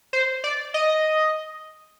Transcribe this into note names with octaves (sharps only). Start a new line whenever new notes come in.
C5
D5
D#5